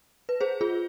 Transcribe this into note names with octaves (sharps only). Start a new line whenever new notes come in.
B4
G#4 C5
F4 G#4